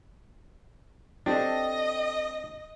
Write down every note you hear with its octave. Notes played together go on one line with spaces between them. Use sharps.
C4 D4 G4 A4 D#5